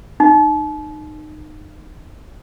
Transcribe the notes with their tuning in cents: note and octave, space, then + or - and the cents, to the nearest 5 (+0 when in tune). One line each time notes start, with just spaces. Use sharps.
D#4 -25